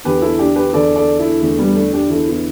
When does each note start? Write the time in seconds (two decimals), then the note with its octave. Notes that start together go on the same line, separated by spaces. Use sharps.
0.04 E2 D3 G4 B4
0.22 E4 A4
0.39 D4 G4
0.56 G4 B4
0.73 E2 D3 A4 D5
0.96 A4 D5
1.19 E4 A4
1.42 E2 D3 A3
1.59 G3 B3
1.75 A3 D4
1.93 D4 G4
2.10 E2 D3 E4 A4
2.28 B3 E4